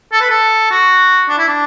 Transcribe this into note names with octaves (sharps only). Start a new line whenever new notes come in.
A4
B4
A4
F#4
D4
E4
D4